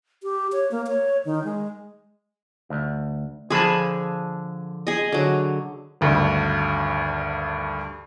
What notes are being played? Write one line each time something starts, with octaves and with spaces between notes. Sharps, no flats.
G4
C#5
A#3
C#5
D#3
G#3
D2
D3 F3 G#4 A5 B5
G#4 D#5
D3 F#3
G#1 D2 G2